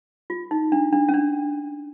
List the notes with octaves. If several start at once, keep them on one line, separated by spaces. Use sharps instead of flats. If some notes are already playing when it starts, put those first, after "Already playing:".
F4
D#4
D4
D4
C#4
D4